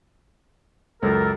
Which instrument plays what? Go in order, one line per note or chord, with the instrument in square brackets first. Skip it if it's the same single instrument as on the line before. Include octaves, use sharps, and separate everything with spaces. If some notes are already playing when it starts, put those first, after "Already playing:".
[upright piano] C#2 F#2 [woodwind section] A4 A#4